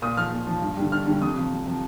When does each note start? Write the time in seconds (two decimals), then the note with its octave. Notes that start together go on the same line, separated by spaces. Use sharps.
0.02 A#2 D#6
0.17 F3 F6
0.32 A#2
0.47 F3
0.62 G2
0.77 D3 G3
0.92 G2 F6
1.06 D3 G3
1.21 F2 D#6
1.36 C3 F3
1.51 F2
1.66 C3 F3